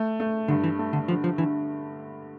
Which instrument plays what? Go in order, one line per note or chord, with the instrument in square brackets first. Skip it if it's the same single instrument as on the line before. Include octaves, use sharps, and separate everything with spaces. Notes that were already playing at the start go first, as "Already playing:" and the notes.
Already playing: [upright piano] A3
A3
[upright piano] G2 [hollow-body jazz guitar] D3
[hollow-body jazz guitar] E3
[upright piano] A3
[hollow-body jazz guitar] D3
[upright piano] D3 [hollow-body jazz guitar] F3
[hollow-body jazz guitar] F3
[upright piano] D3 [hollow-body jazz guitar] E3